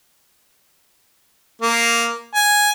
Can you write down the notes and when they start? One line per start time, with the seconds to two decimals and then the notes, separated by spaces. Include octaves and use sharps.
1.62 A#3
2.35 G#5